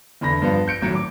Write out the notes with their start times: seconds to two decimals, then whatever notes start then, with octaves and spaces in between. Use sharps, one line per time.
0.21 E2 D3 B5 A#6
0.42 G2 F3 B3
0.68 G6 C#7 D7
0.82 G#1 A2 F#3
0.95 D6